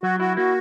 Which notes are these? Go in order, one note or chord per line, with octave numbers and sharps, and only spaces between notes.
F#3 F#4
E4 F#4
A#3 F#4